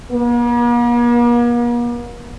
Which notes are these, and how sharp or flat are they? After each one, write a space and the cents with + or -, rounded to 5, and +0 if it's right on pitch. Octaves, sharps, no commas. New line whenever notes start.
A#3 +45